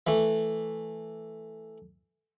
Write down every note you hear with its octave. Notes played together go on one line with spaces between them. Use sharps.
E3 A3